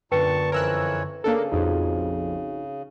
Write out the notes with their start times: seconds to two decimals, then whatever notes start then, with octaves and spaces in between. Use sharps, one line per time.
0.12 F#2 A#2 D3 B4 G5 A5 C#6 C#7
0.52 F2 E3 A#4 C#5 E6 F#6
1.24 C#3 A#3 D4 A4
1.52 A#1 F2 D#4 F#4 G#4